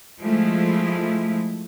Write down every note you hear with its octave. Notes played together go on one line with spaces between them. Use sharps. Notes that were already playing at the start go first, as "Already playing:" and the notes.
F3 G#3 A3 E4